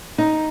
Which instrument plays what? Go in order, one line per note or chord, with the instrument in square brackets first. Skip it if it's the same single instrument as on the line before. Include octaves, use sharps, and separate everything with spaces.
[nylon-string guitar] D#4